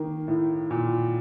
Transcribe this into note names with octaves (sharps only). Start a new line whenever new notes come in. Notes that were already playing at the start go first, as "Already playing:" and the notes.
Already playing: D#3 A#3
A2
A#2